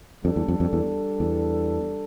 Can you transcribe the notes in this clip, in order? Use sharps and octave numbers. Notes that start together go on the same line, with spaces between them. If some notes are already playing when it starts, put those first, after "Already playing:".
F2 G3 D4 A4
E2
F2
F2
E2
E2